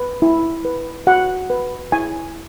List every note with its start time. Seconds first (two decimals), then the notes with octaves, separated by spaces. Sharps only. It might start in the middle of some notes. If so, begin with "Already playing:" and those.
Already playing: B4
0.22 E4
0.65 B4
1.07 F#4 F#5
1.50 B4
1.92 E4 G#5